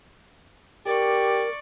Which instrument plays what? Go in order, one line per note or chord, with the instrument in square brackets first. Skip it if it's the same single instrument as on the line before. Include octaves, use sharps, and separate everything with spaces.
[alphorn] G4 [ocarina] A#4 [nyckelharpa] D5 C#6